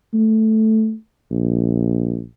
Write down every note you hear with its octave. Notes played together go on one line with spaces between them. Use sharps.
A3
A#1